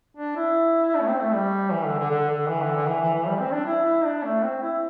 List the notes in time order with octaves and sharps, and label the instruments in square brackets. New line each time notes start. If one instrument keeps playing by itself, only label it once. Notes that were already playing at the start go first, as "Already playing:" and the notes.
[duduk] D4
E4
D4
A3
C4
A3
G3
E3
D3
D3
D3
D3
E3
D3
D3
E3
E3
E3
G3
C4
D4
E4
E4
D4
A3
C4
E4